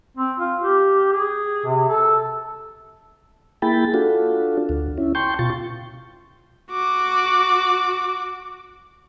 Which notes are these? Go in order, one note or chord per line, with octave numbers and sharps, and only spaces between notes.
C4
F4
G4
G#4
C3
A4
A#3 E4 G#4 G5 B5 A6
D4 F4 F#4 A4
D2
C#4 E4
G5 A5 C6 C#6 G6
B2 F4 C#6 A6
F#4 D6